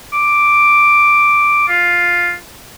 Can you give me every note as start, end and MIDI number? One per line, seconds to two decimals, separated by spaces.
0.13 1.68 86
1.68 2.33 65